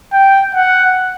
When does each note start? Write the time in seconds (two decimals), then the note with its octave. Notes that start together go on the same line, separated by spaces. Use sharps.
0.13 G5
0.55 F#5